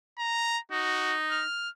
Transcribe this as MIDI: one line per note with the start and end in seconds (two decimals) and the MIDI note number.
0.19 0.58 82
0.71 1.42 63
0.71 1.17 66
1.31 1.69 89